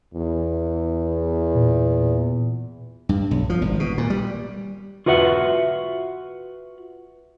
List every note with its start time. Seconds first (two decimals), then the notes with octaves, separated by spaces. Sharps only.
0.14 E2
1.55 A#2
3.09 G2
3.31 B1
3.50 F3
3.62 G#1
3.80 B2
3.98 A#2
4.10 G3
5.06 F4 F#4 B4 E5 F#5